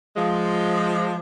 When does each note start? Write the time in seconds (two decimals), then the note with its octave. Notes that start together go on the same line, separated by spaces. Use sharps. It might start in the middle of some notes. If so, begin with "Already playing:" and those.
0.16 F3 G#3